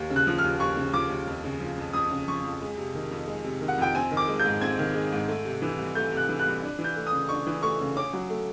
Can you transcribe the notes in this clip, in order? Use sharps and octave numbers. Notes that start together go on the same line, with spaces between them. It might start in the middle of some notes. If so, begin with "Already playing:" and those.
Already playing: D#2
C#3
F#6
F3
F6
D#2
D#2 C#6
C#3
F3 D6
D#2
F2
C#3
F3
F2
F2 D#6
C#3
F3 C#6
F2
G#3
C3
D#3
F2
G#3
C3
D#3
F#5
F2 G5
C4 G#5
D#3
D6
G#3
G6
G#2
C4 G#6
D#3
G#3
G#2
A3
C3
E3
C2
A3 G6
C3 F#6
E3
F#6
C2
D4
E3
G6
A3
D#6
C#3
D4 C#6
E3
A3 C#6
C#3
C#4 D6
F#3
A3